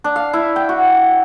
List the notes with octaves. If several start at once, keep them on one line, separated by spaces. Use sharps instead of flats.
D4
F5
E4
G5
F#4